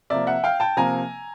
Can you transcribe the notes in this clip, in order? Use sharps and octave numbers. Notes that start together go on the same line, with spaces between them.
C3 F3 A#3 D5 E5
E5 F#5
F5 G5
G5 A5
C3 F3 A#3 G#5 A#5